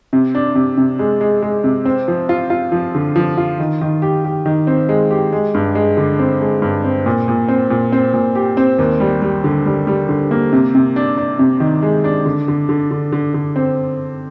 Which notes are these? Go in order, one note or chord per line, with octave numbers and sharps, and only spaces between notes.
C3
D4
C3
C3
G#3
G#3
G#3
C3
C4
F3
F4
F4
F3
D3
F3
F4
D#3
D#3
G4
G4
D#3
C4
G#3
G4
G#3
G2
G#3
D3
C4
G#3
G2
C4
A#2
A#2
C4
A#2
C4
A#2
G4
C4
D#2
G3
G3
D3
G3
G3
D3
A#3
C3
C3
D4
D4
C3
D#3
G#3
D4
D3
D3
D3
D3
D3
D3
C4